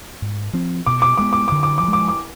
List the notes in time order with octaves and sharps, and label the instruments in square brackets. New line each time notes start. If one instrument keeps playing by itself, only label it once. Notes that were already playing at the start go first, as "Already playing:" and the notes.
[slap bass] G#2
F3 C4
[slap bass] B2 [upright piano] D6
[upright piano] D6
[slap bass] G#3 B3 [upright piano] D6
[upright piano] D6
D6
[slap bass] D3
[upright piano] D6
D6
[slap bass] F3 G#3
[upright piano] D6
D6